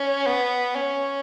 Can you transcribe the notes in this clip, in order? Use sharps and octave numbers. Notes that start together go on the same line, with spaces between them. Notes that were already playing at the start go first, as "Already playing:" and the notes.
Already playing: C#4
B3
C#4